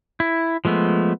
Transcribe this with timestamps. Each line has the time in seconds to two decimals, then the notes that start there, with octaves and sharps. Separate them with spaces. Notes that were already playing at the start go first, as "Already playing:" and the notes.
0.20 E4
0.65 F3 G#3 A3 B3